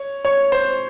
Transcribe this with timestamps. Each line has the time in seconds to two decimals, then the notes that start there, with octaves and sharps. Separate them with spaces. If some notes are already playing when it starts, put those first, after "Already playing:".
Already playing: C#5
0.25 C#5
0.52 C5